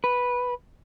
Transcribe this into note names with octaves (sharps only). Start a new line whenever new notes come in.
B4